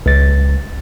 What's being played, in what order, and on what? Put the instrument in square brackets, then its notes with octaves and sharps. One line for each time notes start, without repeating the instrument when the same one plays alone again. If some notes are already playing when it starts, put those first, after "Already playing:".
[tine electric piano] C#2 A6